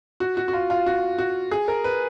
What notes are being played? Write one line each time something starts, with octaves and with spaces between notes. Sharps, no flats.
F#4
F#4
F#4
F4
F4
F#4
F#4
G#4
A#4
B4